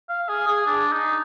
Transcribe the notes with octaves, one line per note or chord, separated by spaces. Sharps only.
F5
G#4
G#4
D4
D#4